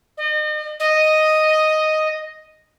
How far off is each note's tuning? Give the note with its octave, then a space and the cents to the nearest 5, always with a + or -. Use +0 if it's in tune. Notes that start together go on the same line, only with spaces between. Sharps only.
D#5 -40
D#5 +0